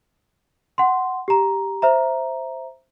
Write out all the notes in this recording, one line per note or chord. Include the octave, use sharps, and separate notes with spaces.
F#5 C6
G4 A#5
C5 E5 A#5